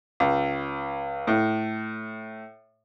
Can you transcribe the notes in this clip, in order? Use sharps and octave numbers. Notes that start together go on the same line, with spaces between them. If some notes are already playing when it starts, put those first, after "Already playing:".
C#2
A2